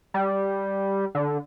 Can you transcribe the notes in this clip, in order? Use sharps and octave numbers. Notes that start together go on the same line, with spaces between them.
G3
D3